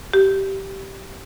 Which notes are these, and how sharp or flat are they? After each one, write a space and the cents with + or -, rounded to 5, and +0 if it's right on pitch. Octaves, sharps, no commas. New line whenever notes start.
G4 -15